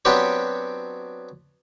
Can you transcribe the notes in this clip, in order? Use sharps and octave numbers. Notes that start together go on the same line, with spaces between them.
F#3 B3 C4 D4 F#4 G4